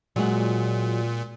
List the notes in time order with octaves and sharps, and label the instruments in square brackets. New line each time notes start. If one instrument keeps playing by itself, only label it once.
[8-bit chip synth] A#2 [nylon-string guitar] F#3 G#3 F#5